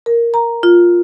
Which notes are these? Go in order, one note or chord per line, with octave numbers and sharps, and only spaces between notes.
A#4
A#5
F4